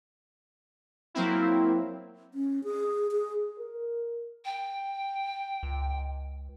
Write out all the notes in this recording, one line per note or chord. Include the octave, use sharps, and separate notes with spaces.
F#3 A#3 C4 E4
C#4
G#4
G#4
A#4
G5
C#2